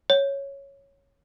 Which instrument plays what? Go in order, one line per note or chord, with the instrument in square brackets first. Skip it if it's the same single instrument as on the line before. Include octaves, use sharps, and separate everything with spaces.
[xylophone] C#5